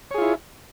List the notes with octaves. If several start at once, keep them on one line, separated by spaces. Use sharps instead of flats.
E4 F4 G#4 C#5